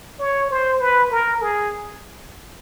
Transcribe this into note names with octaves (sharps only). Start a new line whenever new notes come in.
C#5
C5
B4
A#4
G#4